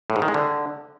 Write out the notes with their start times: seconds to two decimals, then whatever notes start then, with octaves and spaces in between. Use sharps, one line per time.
0.10 A2
0.16 G#2
0.22 D#3
0.28 G#3
0.34 D3